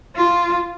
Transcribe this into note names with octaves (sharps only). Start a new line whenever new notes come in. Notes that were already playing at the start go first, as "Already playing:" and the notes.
F4